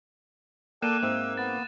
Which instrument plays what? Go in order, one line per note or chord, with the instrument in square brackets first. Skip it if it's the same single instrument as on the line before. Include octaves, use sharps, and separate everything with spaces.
[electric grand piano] A#3 [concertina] A4 D5 G5 [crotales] F#6 D#7 E7
[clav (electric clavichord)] G#2 C4 [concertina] E5
[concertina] B3 [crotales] A6